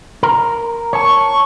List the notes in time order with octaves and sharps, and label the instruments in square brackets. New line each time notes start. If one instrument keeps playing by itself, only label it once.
[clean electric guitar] A#4
[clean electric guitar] C#5 A5 [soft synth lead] C#6